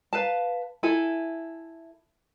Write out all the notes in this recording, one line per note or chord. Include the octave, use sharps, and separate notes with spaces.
B4 F5 A5
E4 A4 G#5